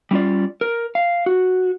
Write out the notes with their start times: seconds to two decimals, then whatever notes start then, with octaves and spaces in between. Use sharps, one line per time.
0.11 G3 C#4 F4 D5
0.61 A#4
0.95 F5
1.26 F#4